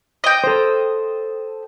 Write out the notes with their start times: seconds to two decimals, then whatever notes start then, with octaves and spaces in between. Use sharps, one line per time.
0.24 D#5 G5
0.44 A4 C5